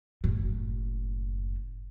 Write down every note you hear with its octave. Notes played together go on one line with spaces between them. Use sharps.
F#1 A2